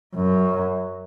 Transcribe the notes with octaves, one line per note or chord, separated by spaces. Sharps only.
F#2